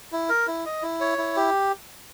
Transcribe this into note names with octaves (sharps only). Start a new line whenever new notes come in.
E4
A#4
E4
D#5
E4
C#5
E4
G4